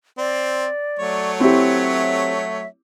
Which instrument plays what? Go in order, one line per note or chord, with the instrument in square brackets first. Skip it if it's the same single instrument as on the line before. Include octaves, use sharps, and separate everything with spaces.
[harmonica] C4 [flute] D5
[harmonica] F#3 A3 C#5
[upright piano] C4 E4 G4 [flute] E5